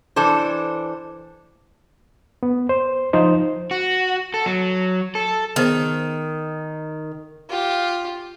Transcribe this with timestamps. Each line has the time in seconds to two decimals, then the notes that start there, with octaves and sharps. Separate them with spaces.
0.16 E3 D4 A4 C5
2.43 B3
2.69 C5
3.13 F3 D#4 C5
3.71 F#4
4.34 A4
4.46 F#3
5.15 A4
5.56 D#3 B3 G#4 C5
7.49 F4 G4